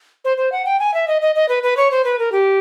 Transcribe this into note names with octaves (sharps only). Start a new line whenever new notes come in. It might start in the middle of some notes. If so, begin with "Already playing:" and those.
C5
C5
F#5
G5
G#5
E5
D#5
D#5
D#5
B4
B4
C#5
C5
B4
A#4
G4